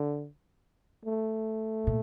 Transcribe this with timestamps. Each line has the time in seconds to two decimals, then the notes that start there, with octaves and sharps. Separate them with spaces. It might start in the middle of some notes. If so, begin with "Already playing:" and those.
Already playing: D3
1.05 A3
1.87 A#2